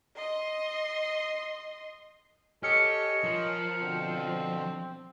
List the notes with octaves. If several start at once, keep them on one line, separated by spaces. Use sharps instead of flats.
D#5 C6
G4 A4 C#5 D#5 G#5 F6 C#7
F3 A#4
B2 D3 C4